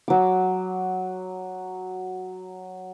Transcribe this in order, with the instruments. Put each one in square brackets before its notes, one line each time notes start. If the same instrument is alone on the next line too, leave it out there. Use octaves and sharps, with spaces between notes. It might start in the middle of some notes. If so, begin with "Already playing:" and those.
[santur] F#3 D6